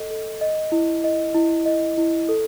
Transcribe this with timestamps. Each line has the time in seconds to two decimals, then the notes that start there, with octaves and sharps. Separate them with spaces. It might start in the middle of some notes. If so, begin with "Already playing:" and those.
Already playing: A4 D#5
0.10 A4
0.41 D#5
0.72 E4
1.04 D#5
1.34 E4
1.66 D#5
1.98 E4
2.29 A4